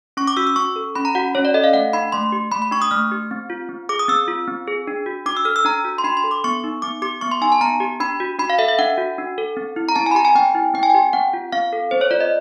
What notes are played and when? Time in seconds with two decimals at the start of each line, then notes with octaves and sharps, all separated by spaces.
0.17 C#4 C#6
0.27 D6
0.37 F#4 E6
0.47 E6
0.56 C#4 C#6
0.76 A4
0.95 C#4 B5
1.05 A#5
1.15 F#4 F#5
1.35 C#4 C#5
1.45 D5
1.54 A4 D#5
1.64 F5
1.73 A3 F#5
1.93 D4 B5
2.12 A3 C6
2.32 G4
2.52 A3 B5
2.62 B5
2.71 D4 C#6
2.82 D#6
2.91 A3 F6
3.11 G4
3.31 C4
3.50 F4
3.69 C4
3.89 G#4 D6
3.99 D#6
4.08 C4 E6
4.28 F4
4.48 C4
4.67 G#4
4.88 D4
5.06 F#4
5.26 D4 D6
5.37 E6
5.45 A4 F6
5.56 E6
5.65 D4 A#5
5.84 F#4
5.98 C6
6.04 D4 B5
6.17 C6
6.24 A4
6.31 D6
6.44 B3 C#6
6.64 D#4
6.82 B3 D6
7.02 G4 D6
7.21 B3 C#6
7.31 C6
7.41 D#4 G#5
7.52 A5
7.61 B3 A#5
7.80 G4
8.00 D4 B5
8.20 F#4
8.39 D4 B5
8.50 F5
8.58 A4 E5
8.69 E5
8.79 D4 F#5
8.98 F#4
9.18 D4
9.38 A4
9.57 C4
9.76 E4
9.89 A#5
9.95 C4 A5
10.06 G#5
10.11 B5
10.15 G4 A#5
10.25 G#5
10.35 C4 G5
10.55 E4
10.74 C4 G5
10.83 G#5
10.90 G4 G5
11.13 C4 F#5
11.34 F4
11.52 C4 F5
11.73 A4
11.91 C4 C5
12.01 C#5
12.11 F4 D5
12.21 D#5